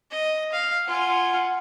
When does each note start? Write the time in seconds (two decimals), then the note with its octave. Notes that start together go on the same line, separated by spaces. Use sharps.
0.11 D#5
0.52 F5
0.87 F4 F#5 G#5